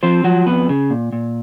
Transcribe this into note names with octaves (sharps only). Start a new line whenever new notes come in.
F3 C4 C5
F3 F#3 F#4
F2 B3 B4
C#3
A#2
A#2